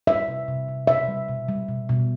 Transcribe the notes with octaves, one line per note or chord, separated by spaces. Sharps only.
G3 E5
C3
C3
C3
B2 E5
G3
B2
G3
B2
B2